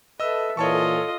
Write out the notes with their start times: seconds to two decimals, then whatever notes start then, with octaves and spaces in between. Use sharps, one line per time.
0.20 A4 B4 D#5 E5 E6
0.57 A#2 E3 F4 C#5 D#5 A5 C#6